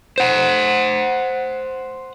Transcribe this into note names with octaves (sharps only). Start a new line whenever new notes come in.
C5 F#5